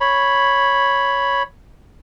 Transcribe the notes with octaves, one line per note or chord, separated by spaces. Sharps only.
C#5 B5